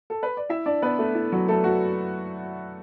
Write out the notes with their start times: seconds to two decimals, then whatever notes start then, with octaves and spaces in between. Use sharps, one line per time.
0.10 A4
0.23 B4
0.37 D5
0.49 E4 E5
0.66 D4 D5
0.82 B3 B4
0.99 A3 A4
1.15 E4
1.32 F#3 F#4
1.48 A3 A4
1.64 F#3 F#4